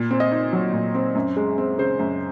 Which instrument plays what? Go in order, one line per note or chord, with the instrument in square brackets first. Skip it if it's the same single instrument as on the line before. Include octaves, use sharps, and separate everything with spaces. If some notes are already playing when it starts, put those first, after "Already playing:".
Already playing: [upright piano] A#2
C4
D#5
D#4
F#3
A#2
C4
F#2
G#3
C4
C#3 C5
F#2